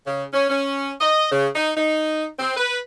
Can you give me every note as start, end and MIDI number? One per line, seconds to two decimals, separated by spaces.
0.07 0.24 49
0.33 0.47 61
0.50 0.91 61
1.01 1.30 75
1.32 1.48 49
1.55 1.71 63
1.77 2.25 63
2.39 2.54 60
2.57 2.78 71